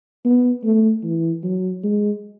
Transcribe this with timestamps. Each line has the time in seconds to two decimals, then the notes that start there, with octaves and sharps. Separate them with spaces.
0.25 B3
0.64 A3
1.04 E3
1.43 F#3
1.84 G#3